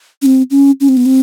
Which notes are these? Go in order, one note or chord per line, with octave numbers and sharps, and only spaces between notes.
C#4
C4
C#4
C#4
C4
B3
C4